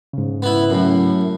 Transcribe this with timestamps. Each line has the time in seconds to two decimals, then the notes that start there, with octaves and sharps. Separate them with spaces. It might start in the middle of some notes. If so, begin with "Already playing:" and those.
0.13 G#2 C#3
0.42 B3 E4
0.70 F#2 A2